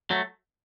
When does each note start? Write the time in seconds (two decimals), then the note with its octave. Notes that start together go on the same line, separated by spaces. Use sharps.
0.11 F#3 A3